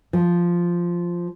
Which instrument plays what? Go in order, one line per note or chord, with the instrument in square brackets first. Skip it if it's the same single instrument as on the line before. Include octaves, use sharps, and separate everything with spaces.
[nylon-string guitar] F3